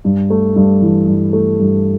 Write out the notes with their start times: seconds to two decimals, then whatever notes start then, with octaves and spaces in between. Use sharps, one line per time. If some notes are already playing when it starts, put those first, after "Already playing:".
0.05 G2
0.30 A3
0.56 G2
0.82 E3
1.08 G2
1.33 A3
1.60 G2